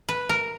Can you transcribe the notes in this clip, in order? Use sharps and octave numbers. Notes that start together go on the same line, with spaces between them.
B4
A#4